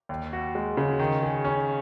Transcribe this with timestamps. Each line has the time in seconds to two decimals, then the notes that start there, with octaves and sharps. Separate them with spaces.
0.09 D#2
0.33 F#4
0.55 G#3
0.77 C#3
0.99 D#3
1.23 G#4
1.44 C#4